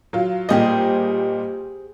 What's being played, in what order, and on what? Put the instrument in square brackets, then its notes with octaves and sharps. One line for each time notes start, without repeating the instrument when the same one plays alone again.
[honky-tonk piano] F#3 F4
[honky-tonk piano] A#2 G3 D#5 [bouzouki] G4 G#4 C5